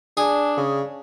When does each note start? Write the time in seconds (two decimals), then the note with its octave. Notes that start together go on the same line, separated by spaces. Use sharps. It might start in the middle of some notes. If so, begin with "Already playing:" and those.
0.17 D4 G#4
0.57 C#3